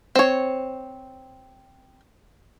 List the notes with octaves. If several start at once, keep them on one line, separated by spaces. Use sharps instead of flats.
C4 C#5